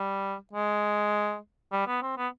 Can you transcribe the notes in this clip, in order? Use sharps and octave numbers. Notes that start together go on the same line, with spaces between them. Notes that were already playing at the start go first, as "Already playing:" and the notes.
Already playing: G3
G#3
G3
B3
C4
B3